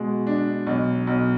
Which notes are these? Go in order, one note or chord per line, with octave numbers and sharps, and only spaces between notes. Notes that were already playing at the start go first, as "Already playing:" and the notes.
Already playing: B2 G#3
D4
B1
B1